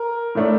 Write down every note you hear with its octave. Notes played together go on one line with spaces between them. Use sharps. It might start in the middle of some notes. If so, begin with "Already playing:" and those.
Already playing: A#4
A2 A3 D4